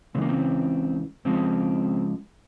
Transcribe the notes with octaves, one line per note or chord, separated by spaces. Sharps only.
C#2 C#3 E3 G#3 C4
A#3
C4
C#2 C#3 F3 G#3 C4